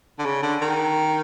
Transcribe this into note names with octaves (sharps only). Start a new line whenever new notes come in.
D3
C#3
D3
D#3